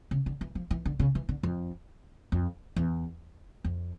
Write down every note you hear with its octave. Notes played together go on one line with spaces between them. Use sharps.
C#3
D3
E3
F3
E3
D3
C#3
E3
D3
F2
F2
E2
F2